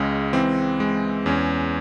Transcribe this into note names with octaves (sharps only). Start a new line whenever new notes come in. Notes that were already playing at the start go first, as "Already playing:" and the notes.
Already playing: C#2 G#3 C#4
E3 C4
G#3
E2 C#4